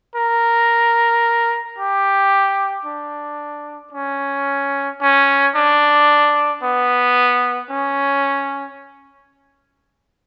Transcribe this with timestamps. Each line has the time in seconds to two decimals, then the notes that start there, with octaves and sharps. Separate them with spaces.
0.15 A#4
1.78 G4
2.85 D4
3.93 C#4
5.01 C#4
5.55 D4
6.63 B3
7.71 C#4